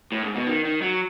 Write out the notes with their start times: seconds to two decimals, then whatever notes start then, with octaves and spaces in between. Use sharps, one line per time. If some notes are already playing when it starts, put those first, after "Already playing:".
0.12 A2
0.23 G#2
0.35 B2
0.47 D#3
0.65 D#3
0.82 F#3